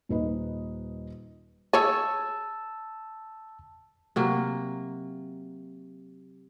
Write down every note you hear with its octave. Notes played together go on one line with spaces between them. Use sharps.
D#1 D#4 B4 D#5
G#4 C#5 A5 E6
C3 F#3 A#3